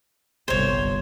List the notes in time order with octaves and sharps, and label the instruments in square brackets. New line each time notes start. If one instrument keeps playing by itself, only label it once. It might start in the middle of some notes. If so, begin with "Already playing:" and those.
[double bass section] G1 C2 [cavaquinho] C5 C#5